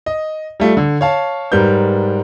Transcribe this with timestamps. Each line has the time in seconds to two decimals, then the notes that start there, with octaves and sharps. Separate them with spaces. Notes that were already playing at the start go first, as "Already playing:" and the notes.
0.06 D#5
0.60 G3 A3 F4
0.77 D3
1.01 C#5 F5 A5
1.52 G#2 G3 A#4 B4 G6